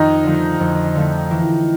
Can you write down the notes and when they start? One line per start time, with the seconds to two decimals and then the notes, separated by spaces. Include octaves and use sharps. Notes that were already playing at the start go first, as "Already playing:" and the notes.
Already playing: F2 D#3 D#4
0.24 D3 F3 A3
0.60 F2
0.95 D3 F3 A3
1.31 E3